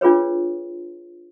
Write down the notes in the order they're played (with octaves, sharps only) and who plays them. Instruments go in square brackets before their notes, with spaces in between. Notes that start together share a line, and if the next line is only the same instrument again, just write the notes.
[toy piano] D4 F4 G#4 B4 C#5